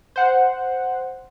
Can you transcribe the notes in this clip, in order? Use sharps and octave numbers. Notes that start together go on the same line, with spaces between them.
C5 F#5